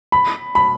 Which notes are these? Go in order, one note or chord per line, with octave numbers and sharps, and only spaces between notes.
B5
B5